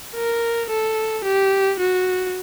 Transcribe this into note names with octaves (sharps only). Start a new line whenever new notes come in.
A#4
A4
G4
F#4